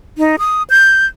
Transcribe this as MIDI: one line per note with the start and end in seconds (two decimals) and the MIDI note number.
0.18 0.36 63
0.39 0.63 87
0.70 1.06 91